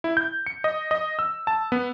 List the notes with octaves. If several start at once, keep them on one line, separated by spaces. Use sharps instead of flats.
E4
G6
C#7
D#5
D#5
E6
A5
B3